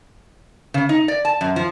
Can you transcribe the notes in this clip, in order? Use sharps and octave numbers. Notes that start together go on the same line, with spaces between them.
C#3
D#4
D5
A5
F#2
F3